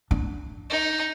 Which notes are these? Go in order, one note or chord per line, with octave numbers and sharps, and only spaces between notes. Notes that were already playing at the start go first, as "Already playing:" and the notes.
D4
D#4